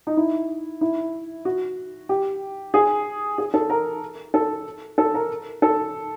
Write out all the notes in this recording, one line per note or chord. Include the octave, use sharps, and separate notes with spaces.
D#4
E4
E4
F#4
G4
G#4
G#4
A4
A#4
A4
A4
A#4
A4